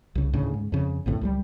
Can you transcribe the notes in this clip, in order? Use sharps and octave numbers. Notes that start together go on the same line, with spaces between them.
C2 C#3
D2 A2 C#3
G#2
F2 C#3
A#1 F2 A2 D3
C#2 E3 G3